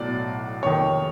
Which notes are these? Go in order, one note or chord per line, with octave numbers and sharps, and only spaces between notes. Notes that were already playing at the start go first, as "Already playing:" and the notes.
Already playing: B1 A2 F#3 D5
F1 D#2 D#3 C#5